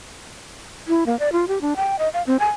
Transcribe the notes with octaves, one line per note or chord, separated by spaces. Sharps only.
E4
A#3
D5
F4
G4
D4
G5
D#5
F5
C4
G#5